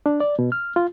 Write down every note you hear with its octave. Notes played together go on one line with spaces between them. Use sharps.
D4
D5
B2
F6
F4